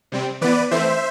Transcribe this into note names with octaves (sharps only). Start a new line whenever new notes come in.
C3 G3 C4
E3 B3 B4 D5
E3 A3 C4 C5 E5